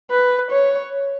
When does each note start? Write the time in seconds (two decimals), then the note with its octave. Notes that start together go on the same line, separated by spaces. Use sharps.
0.11 B4
0.51 C#5